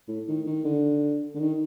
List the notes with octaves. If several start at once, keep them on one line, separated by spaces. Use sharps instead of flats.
A2
D#3
D#3
D3
D3
D#3